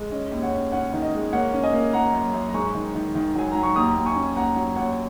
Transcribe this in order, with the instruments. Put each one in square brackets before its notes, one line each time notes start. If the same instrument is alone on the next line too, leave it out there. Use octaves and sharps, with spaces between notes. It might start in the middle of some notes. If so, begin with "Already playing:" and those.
Already playing: [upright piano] G#3
C#4 D#5
D#2
C#5 F#5
C#4
C#4 C#5 F#5
D#3
D#5
G#3
A#3 C#5 F#5
C#4
D#5 G#5
A#3
A#3 F#5 A#5
F#2
F#2
A#5
G#2 G#5 C#6
D#3
D#3
D#3
F#3 G#5
F#3 A#5
C#6
D#2 A#5 D#6
D#2
G#5 C#6
C#4
D#2 F#5 A#5
F#3
D#2 C#5 F#5